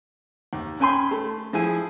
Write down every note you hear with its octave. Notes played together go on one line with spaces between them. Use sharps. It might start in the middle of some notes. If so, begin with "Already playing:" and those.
D#2
C#4 G5 G#5 B5 C6
A3
F3 E4 G#4 G#5